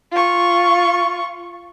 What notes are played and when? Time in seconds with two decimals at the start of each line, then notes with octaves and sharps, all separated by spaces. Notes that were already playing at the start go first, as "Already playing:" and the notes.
0.12 F4 C#6